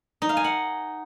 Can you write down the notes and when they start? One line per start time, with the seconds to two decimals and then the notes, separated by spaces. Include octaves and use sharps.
0.22 D#4
0.29 F5
0.37 G#5
0.44 F#5